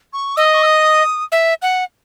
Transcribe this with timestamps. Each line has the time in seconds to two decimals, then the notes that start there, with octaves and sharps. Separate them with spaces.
0.13 C#6
0.36 D#5 E6
0.45 D#6
0.54 C#6
0.63 E6
0.66 D#6
1.32 E5
1.62 F#5